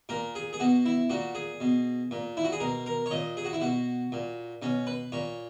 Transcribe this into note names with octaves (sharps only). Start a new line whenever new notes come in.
A#2 A#4
G#4
G#4
B2 F#4
E4
A#2 F#4
G#4
B2
A#2
E4
F#4
G#4
B2 A#4
A#4
C#5
A#2 D#5
G#4
F#4
E4
B2 F#4
A#2
B2 C#4
B4
A#2 C#5